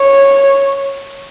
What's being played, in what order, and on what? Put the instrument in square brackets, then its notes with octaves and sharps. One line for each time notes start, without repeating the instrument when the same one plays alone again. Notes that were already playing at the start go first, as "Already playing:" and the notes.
Already playing: [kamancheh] C#5